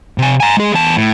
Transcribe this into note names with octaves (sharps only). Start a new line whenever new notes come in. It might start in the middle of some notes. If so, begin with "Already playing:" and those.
C3 G#5
G#5 A#5
G#3 G#4
E2 A5
A2